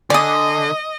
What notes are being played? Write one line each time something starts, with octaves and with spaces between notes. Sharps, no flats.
D3 D5 D#5 G#5 D#6